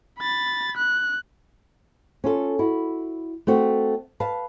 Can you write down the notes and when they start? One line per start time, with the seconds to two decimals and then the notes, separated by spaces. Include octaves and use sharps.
0.19 B5 A6
0.77 F#6
2.24 C#4 F4 A4
2.59 E4 F#4
3.47 A3 C4 F#4
4.20 B4 F5 A5